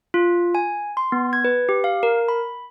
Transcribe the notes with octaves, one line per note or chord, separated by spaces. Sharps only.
F4
G#5
C6
B3
G#6
B4
G4
F5
A#4
B5